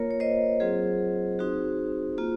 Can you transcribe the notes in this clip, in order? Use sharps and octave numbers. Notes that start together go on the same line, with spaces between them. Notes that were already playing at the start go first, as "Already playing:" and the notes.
Already playing: A#3 F4 A#4 C#5
C#5
C5 D#5
F#3 C4 F4 G#4 C5
C4 D#4 F#4
A#3 F4